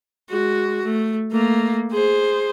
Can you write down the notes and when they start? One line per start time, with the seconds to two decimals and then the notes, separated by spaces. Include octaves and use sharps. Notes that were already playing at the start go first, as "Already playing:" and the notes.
0.30 G#3 F#4
0.85 A3
1.32 A3 A#3
1.92 G#4 C5